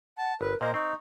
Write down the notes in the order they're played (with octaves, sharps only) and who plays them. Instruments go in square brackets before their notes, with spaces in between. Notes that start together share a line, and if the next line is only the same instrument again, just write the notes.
[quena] F#5 [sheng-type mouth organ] A5
[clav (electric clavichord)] G1 [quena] A#4 [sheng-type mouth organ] B4
[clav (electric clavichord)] A#2 A#3 [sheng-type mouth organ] A#4 C5 [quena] D#5
[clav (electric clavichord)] C4 [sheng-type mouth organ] D#4 [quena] C#6